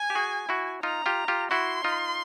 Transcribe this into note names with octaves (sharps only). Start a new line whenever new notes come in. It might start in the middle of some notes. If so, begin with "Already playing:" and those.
Already playing: G#5
G4
F#4 G#4
E4 F#4
D#4 F4 A#5
F4 G4
F4 G4
E4 F#4 C6
D#4 F4